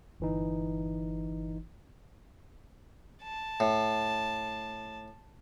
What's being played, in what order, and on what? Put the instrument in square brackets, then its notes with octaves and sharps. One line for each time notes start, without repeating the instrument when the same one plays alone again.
[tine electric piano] G1 E3 D#4
[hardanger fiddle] A5
[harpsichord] A2